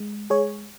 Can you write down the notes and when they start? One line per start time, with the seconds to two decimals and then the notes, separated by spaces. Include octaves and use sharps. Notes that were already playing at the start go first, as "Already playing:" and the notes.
Already playing: G#3
0.30 G#3 G#4 C#5